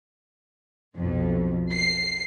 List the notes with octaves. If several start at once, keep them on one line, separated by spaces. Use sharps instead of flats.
B1 F2
C7